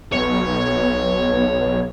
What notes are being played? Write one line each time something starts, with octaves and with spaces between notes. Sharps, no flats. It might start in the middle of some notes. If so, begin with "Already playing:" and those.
B1 C#5